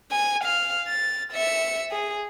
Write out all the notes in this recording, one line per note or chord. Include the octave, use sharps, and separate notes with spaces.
G#5
F5
A6
E5 C#7
G#4